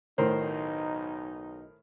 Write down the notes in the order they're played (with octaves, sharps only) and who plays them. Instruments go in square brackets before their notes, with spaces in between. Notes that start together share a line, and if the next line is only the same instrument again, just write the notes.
[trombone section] B1 D#4 [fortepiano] A2 D#3 C5